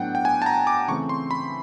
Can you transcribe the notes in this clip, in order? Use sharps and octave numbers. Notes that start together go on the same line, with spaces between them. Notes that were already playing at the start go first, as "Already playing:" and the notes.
Already playing: A2 F#3 B3 D4 F#5 G5
G5
G#5
A5
A#5
D6
C#3 E3 A3 C4 C#6
C6
B5